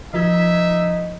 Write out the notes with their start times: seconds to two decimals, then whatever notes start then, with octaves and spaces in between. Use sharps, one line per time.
0.13 F3 D#4 F4 E5 G#6